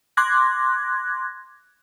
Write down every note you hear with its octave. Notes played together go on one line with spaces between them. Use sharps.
C6 D6 F#6 G#6 A#6